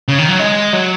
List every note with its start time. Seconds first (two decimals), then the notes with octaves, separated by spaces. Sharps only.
0.08 C#3
0.18 D#3
0.29 F#3
0.39 G#3
0.73 F#3